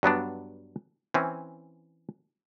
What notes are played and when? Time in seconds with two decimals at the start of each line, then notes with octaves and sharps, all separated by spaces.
0.03 G2 F#3 B3 D4
1.14 E3 C4 C#4